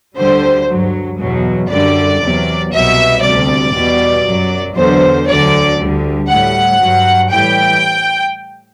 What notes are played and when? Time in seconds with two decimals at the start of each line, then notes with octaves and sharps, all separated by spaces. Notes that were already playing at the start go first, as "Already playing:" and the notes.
0.16 D2 D3 G3 C5
0.67 G2 F#3
1.18 E2 B2 F#3
1.69 F#2 D3 G3 D5
2.20 E2 C3 F#3
2.72 C2 B2 F#3 E5
3.22 D2 C3 G3 D5
3.73 E2 B2 G3
4.25 F#2 F#3
4.75 E2 D3 F#3 C5
5.27 D2 D3 F#3 D5
5.78 D2 D3 G3
6.28 A2 G3 F#5
6.80 G2 F#3
7.31 A2 E3 G3 G5